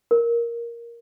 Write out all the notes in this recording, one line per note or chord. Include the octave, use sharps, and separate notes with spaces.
A#4